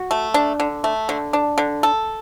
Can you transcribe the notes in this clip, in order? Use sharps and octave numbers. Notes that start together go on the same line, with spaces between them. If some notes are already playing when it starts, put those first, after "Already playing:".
Already playing: F#4
A3
D4
D3
A3
D3
D4
D3
A4